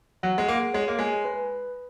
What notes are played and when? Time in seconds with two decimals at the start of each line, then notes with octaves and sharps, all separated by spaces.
0.23 F#3 F#5
0.38 G#3
0.48 A#3 G#4
0.74 G#3 C#5
0.88 A#3
0.99 G#3 G#5
1.25 B4